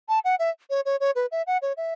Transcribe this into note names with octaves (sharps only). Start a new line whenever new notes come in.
A5
F#5
E5
C#5
C#5
C#5
B4
E5
F#5
C#5
E5